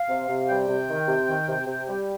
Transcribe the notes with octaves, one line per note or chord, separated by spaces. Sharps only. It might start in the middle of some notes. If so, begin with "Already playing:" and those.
Already playing: F5
C3
C3
G3 G5
C3
D#3
C3
D#3
C3
C3
G3